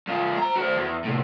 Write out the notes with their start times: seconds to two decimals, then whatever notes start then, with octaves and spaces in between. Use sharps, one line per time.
0.07 G#2 F4
0.37 C5 A#5
0.56 F#4 C5
0.77 E2
1.04 A2 C3